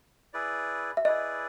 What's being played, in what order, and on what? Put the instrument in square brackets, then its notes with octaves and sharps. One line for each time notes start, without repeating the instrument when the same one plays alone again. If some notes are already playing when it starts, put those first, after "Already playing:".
[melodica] E4 G#4 B4 D5
[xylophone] E5
[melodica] E4 G#4 B4 D5 [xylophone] D#5